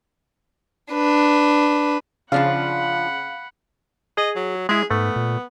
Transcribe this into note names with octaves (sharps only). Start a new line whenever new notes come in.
D4 B4
C#3 F3 D4 F4 F5 F#5 B5
G#4 D#5
F#3
G#3 E4 G#4
G#2 A3 B3
A#2